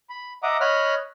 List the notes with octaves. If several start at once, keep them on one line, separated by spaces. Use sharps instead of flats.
B5
D#5 E5 F#5 A#5 D6 D#6
C#5 D#5 B5 F6 F#6